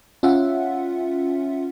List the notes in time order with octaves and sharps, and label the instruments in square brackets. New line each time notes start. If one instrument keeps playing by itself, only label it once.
[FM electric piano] C#4 F4 E5 F#5